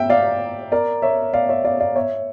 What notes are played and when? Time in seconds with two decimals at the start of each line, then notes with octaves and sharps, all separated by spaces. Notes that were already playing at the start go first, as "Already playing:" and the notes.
Already playing: E5 G5
0.10 D5 F5
0.72 A#4 D5
1.02 C#5 E5
1.33 D5 F5
1.49 C#5 E5
1.65 D5 F5
1.80 D5 F5
1.96 C#5 E5